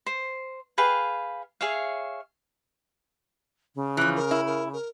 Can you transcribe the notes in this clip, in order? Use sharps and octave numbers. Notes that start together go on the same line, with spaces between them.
C5
G#4 B4 F5 G5
G#4 C#5 E5 F5
C#3
E3 F3 F#6
A#4
E4
A#4
A#4